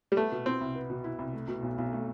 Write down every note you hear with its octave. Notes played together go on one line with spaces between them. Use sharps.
G3
A3 B3
B2
C4 E4
C2
B3
B2
E4
C2
A3
B2
B1
B1
A3